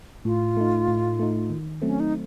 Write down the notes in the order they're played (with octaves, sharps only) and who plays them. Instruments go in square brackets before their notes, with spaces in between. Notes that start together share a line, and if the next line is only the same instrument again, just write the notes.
[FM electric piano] A2 [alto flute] F4
[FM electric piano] A3 D#4
A2
A3 D#4
D#3
[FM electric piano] F#3 A3 C4 [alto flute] C#4
[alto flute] D#4